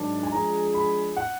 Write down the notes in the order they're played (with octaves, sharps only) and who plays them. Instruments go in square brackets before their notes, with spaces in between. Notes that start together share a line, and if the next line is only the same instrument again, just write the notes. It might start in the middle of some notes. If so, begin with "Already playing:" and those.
Already playing: [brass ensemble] G#2 D#3 F#3 D4
[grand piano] G#5
[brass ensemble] F3 G#3 D4 G#4 [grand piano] A#5
[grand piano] B5
F#5